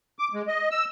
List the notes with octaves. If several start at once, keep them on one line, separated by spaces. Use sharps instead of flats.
D6
G#3
D#5
E6